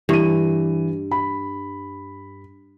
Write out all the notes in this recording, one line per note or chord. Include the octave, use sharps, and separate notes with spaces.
G2 E3 D#7
B5